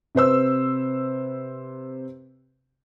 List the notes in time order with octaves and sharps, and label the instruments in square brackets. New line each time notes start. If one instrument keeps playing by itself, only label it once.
[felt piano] C3 B4 C5 E6